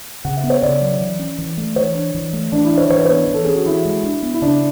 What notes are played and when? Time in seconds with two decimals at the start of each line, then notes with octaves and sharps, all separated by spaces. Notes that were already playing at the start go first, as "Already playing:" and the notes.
0.25 C#3 F#5
0.37 E5
0.44 B3
0.50 C#5
0.62 C#3 D5
0.81 F#3
1.01 E3
1.19 C#4
1.38 E3
1.58 A3
1.76 E3 C#5
1.95 D4
2.15 E3
2.33 A3
2.52 E3 D4
2.65 E4
2.71 D4
2.77 C#5
2.90 E3 C#5
2.98 B4
3.06 B3 C#5
3.28 E3
3.34 A4
3.45 C#4 G#4
3.56 F#4
3.66 E3 E4
3.85 G#3
4.04 D4
4.23 B3
4.34 E4
4.42 C#3 D4